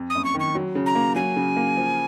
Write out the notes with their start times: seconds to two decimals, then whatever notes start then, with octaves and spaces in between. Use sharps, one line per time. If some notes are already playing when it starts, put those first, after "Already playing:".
Already playing: F2
0.10 D#6
0.15 F#1
0.25 C#6
0.35 D#3
0.40 C#6
0.55 F#3
0.75 C#3
0.86 A#5
0.95 A#3
1.15 F#3 G#5
1.37 C#3
1.56 A#3
1.77 F3